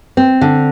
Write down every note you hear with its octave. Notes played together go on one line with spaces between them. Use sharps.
C4
D3